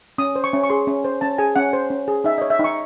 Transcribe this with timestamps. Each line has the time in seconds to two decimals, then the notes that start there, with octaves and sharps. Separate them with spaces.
0.18 C#4 D#6
0.36 C5
0.44 C#6
0.53 C#4
0.64 C#6
0.70 G#4 C6
0.87 C#4
1.04 C5
1.21 C#4 A5
1.38 G#4 G#5
1.56 C#4 F#5
1.73 C5
1.90 C#4
2.08 G#4
2.24 D#4 E5
2.38 D#5
2.42 C#5
2.50 E5
2.59 D#4
2.64 C#6